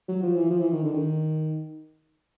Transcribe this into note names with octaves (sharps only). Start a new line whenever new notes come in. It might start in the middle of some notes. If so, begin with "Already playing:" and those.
F#3
F3
E3
F3
E3
D#3
D3
D#3